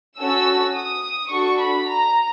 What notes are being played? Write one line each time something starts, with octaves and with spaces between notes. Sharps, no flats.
C#4 F#4 A4 E6
D#6
D4 F#4 A4 C#6
B5
A#5